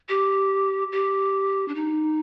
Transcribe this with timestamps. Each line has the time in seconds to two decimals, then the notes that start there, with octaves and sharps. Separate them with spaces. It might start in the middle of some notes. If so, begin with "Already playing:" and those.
0.09 G4
0.92 G4
1.68 D4
1.75 D#4